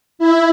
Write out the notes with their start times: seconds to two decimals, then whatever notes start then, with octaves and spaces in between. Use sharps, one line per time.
0.19 E4